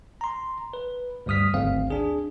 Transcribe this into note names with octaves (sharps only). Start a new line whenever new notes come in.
A#5 C6
B4
D2 G2 G3 D#6 F6 B6
G#1 D2 C4 F5
D4 G#4